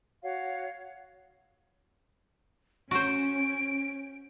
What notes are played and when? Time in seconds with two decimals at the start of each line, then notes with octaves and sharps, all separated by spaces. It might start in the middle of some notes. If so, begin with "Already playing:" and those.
0.22 F#4 C#5 F5 F#5
2.91 C#4 F#4 C5 D7